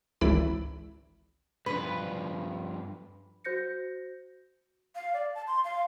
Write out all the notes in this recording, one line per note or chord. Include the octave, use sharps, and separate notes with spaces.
G#1 C#2 E3 E4 D5 B5
G2 F3 B4
F#4 C5 G6 A#6 C#7
F5
D5
A5
C6
F5